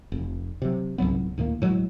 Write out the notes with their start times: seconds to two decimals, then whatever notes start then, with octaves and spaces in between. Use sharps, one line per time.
0.12 F1
0.62 C3 F#3
0.98 C2 G#2 F#3 B3
1.38 D2 A2 D#3 A#3
1.62 A2 F#3 G#3